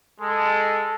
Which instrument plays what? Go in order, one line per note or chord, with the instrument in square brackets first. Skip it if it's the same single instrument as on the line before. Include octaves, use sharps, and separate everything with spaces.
[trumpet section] G#3 A4